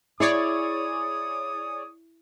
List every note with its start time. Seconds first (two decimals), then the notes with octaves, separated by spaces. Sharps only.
0.20 E4 G#4 C#5 D5 D#6